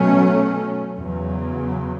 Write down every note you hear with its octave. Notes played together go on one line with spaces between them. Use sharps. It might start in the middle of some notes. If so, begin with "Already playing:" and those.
Already playing: B2 F#3 A3 C#4
E2 C#3 F#3